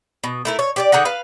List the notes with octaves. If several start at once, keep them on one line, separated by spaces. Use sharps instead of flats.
B2
A3 E4 A#4
C#5
G4 C#5 D5
D3 D#4 G#4 F#5
B4 F5